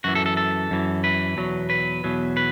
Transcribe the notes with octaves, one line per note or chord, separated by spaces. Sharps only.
F#2 E3 F#4
A4
A4
A4
F#2 E3
B4
E2 B2 F#3
B4
E2 B2 F#3
B4